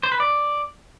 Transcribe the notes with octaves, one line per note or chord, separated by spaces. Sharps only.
C5
B4
D5